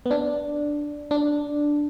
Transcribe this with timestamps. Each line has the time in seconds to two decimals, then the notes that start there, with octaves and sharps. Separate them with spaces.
0.06 B3
0.11 D4
1.11 D4